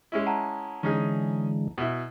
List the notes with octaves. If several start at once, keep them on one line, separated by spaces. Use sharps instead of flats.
G#3 C#4 E4
F#5 A5 A#5
D3 E3 G#3 C#4 D#4 G#4
B2 E4